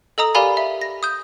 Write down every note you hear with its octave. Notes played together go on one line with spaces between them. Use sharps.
A4 D#5 A#5 D#6
G4 A#4 D5 F5 G#5 B5
E5
A#6
D#6 G6